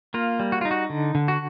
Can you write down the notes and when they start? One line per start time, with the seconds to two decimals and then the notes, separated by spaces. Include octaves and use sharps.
0.14 A#3 F4
0.40 G3
0.52 F#4
0.61 D#4 F4
0.71 F#4
0.90 D3
1.15 D3
1.28 F#4